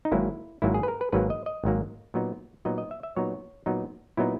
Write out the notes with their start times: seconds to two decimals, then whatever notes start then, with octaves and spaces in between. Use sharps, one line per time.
0.05 D#4
0.12 G#1 G#2 F#3 A#3 E4
0.62 G#1 G#2 F#3 A#3 E4
0.74 G#4
0.83 B4
0.88 A#4
1.01 B4
1.12 G#1 G#2 F#3 A#3 B4
1.30 D#5
1.46 D#5
1.64 G#1 G#2 F#3 A#3
2.14 A#2 F#3 B3 D#4
2.65 A#2 F#3 B3 D#4 D#5
2.78 D#5
2.91 E5
3.03 E5
3.16 A#2 F#3 B3 D#4 C#5
3.66 A#2 F#3 B3 D#4
4.17 A#2 F#3 B3 D#4 E4